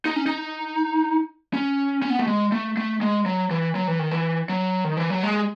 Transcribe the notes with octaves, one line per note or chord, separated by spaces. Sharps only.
D#4
C#4
D#4
C#4
C#4
B3
A3
G#3
A3
A3
G#3
F#3
E3
F#3
E3
D#3
E3
F#3
D#3
E3
F#3
G#3